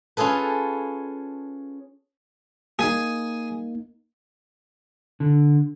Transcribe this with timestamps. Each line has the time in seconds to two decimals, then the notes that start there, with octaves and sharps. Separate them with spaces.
0.17 C#4 F4 G#4 A4 B4
2.79 A#3 D#4 G#4 G#5
5.20 D3